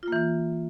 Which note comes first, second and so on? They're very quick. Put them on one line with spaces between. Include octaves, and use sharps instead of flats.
F4 A#3 E3